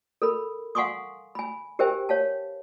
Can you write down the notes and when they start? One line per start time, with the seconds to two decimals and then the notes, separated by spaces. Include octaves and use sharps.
0.22 A4 A#4 B5
0.75 F5 F#5 G#5 C6 C#6 D#6
1.35 G#5 B5
1.79 G4 A#4 C5 E5 G5 G#5
2.09 C#5 F5 A5